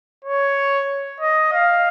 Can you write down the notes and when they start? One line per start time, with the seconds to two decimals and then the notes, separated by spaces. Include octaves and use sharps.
0.25 C#5
1.20 D#5
1.53 F5